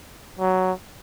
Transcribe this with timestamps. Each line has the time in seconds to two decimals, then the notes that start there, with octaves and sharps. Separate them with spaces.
0.39 F#3